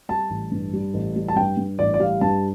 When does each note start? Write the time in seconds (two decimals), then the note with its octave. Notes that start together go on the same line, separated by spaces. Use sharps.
0.09 G3 A5
0.30 A1
0.52 G2
0.73 G3
0.94 A1
1.16 G3
1.28 A5
1.36 G2 G5
1.57 G2
1.79 A1 D5
1.94 D5
2.00 G3 F5
2.21 G2 A5